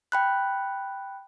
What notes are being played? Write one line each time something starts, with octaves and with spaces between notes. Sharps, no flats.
G5 B5 F#6